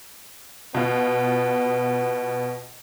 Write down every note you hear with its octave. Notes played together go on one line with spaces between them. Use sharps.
B2 B3 F4